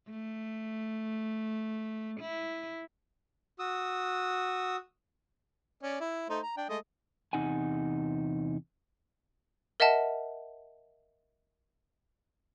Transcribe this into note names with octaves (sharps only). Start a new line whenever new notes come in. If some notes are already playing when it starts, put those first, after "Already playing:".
A3
E4
F#4 D#6 E6
C#4 D5
E4
A3 D#4 C5
A#5
D4 G5
G#3 A3 D#5
E2 C3 D#4 F#5 G#5
A#4 D#5 E5 F#5 A5